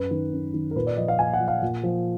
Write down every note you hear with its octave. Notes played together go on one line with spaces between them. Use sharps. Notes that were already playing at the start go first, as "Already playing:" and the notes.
Already playing: F#2 B4
D#3
F#2
D#3
A#4
A#2 B4
D5
F3 D#5
F5
A#2 G#5
F#5
F3
F5
A#2
F3